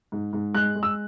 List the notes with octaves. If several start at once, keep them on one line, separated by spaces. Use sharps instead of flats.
G#2
G#2
G#3 F#6
G#3
E6